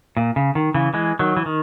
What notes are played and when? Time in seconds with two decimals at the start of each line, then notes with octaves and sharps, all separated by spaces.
0.17 A#2
0.36 C#3
0.55 D#3
0.74 C#3 E3
0.94 E3 G#3
1.19 D#3 F#3
1.37 E3
1.46 D#3